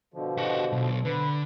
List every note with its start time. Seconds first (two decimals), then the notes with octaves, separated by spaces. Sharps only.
0.14 B2 D3 F3
0.38 F#4 G4
0.72 B1
1.05 D3 B4